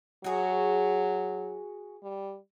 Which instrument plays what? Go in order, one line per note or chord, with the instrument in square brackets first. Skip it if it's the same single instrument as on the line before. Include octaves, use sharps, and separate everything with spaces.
[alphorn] F#3 [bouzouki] F#4 G#4
[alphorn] G3